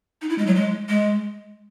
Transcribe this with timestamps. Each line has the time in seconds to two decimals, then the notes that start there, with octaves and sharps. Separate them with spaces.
0.22 D#4
0.30 E4
0.38 G#3
0.47 F#3
0.56 G#3
0.89 G#3